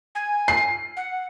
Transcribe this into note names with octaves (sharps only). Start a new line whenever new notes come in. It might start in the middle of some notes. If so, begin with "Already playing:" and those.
G#5
C7
F#5